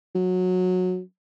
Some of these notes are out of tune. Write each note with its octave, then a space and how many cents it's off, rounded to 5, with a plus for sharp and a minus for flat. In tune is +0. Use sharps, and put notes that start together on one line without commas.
F#3 -15